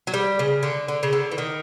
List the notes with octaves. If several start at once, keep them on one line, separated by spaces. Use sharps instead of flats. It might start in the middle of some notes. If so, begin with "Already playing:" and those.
F#3
G3
C#3
D3
D3
C#3
D3
E3
D#3